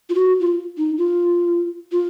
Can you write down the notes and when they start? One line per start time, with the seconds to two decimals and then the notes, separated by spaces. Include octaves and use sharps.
0.09 F4
0.15 F#4
0.40 F4
0.78 D#4
0.98 F4
1.92 F4